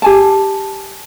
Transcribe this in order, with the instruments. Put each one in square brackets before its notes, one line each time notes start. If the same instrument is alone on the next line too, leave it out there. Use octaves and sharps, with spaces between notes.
[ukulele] G4 G#5 A5